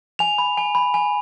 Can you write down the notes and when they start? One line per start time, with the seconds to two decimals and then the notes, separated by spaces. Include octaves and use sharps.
0.19 G#5 F7
0.38 B5
0.57 G#5
0.75 B5
0.94 G#5